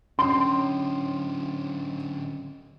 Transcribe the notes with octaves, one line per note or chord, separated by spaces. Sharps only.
D3 F#3 C#4 C6